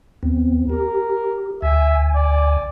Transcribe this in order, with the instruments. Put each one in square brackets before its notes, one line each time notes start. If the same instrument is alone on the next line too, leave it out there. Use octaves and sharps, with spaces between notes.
[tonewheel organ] D#2 B3 C4
[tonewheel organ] G4 [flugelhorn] A#4
[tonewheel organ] D2 G#5 [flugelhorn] E5
[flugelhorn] D5